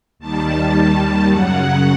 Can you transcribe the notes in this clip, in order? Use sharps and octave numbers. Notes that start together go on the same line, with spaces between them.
D#2 D#3 G3 A5
F#2 C#3 F#3 F#5